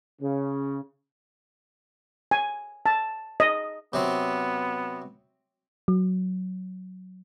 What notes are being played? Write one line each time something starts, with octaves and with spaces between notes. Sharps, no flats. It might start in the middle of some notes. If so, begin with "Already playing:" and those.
C#3
G#5
A5
D#5
C3 F#3 B3 C4
F#3